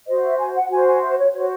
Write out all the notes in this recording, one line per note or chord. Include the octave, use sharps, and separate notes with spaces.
F#4 C5 D#5
E5
G#5
F#5
F#4 C5 G#5
G#5
E5
C#5
F#4 C5 C#5